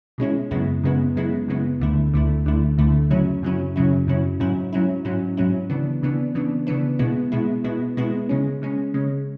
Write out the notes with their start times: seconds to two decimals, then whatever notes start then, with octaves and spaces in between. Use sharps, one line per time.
0.18 B2 G#3 C#4 E4
0.51 F#2 C#3 G#3 B3 E4
0.83 F#2 C#3 G#3 B3 E4
1.16 F#2 C#3 G#3 B3 E4
1.48 F#2 C#3 G#3 B3 E4
1.80 D2 D3 A3 E4
2.14 D2 D3 A3 E4
2.45 D2 D3 A3 E4
2.77 D2 D3 A3 E4
3.10 F#2 C#3 F#3 C#4 E4
3.42 F#2 C#3 F#3 C#4 E4
3.76 F#2 C#3 F#3 C#4 E4
4.07 F#2 C#3 F#3 C#4 E4
4.40 G#2 F#3 C#4 E4
4.73 G#2 F#3 C#4 E4
5.05 G#2 F#3 C#4 E4
5.37 G#2 F#3 C#4 E4
5.70 C#3 E3 B3 D4
6.02 C#3 E3 B3 D4
6.35 C#3 E3 B3 D4
6.67 C#3 E3 B3 D4
6.99 B2 G#3 B3 E4
7.32 B2 G#3 B3 E4
7.64 B2 G#3 B3 E4
7.97 B2 G#3 B3 E4
8.29 C#3 G#3 C#4
8.62 C#3 G#3 C#4
8.94 C#3 G#3 C#4